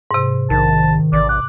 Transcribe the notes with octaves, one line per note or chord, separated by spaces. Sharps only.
G#2 C3
A#1 D#3 A5
A1 D5
D6 F#6